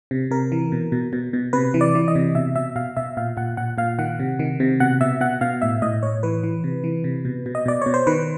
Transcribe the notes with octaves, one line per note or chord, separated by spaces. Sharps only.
C3
C3 A#4
E3
B2
B2
B2
B2
C3 B4
E3
D5
E3
D#5
C3
B2 E5
B2 E5
B2 F5
B2 E5
A#2 F5
A#2 F#5
A#2 F#5
A#2 F5
D#3 F#5
C3
D#3
C3
B2 F#5
B2 E5
B2 F#5
B2 F5
A2 E5
A2 D#5
A2 C#5
E3 B4
E3
C3
E3
C3
B2
B2
D#5
B2 D5
B2 C#5
C5
D#3 B4